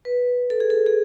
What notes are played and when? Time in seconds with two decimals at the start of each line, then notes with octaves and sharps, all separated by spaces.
0.05 B4
0.50 A4
0.60 G#4
0.70 A4
0.86 G#4